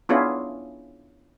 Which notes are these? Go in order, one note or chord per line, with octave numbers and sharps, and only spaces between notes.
B3 C#4 D4 E4 F4 G#4